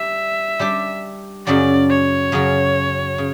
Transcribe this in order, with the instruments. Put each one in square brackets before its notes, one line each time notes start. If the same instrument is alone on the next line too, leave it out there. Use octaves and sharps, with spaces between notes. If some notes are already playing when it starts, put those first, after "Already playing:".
Already playing: [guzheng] G3 D4 [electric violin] E5
[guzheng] G3 D4 G4
[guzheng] F#2 C#3 F#3 C#4 [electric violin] D5
[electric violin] C#5
[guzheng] F#2 C#3 F#3 C#4
C#3